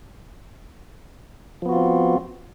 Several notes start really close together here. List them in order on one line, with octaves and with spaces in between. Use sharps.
F3 B3 F#4 F4 C4